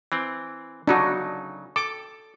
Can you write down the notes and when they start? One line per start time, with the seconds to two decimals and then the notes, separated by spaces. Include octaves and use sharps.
0.12 E3 C4
0.87 C#3 F#3 D4 D#4 F#4
1.76 A4 D6